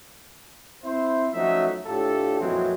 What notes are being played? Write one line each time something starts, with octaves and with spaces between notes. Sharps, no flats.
C4 E4 C5
F3 F#3 A3 C#4 D#4 E5
A2 D4 F4 G4 A4
F2 A#2 E3 F#3 G#3 C4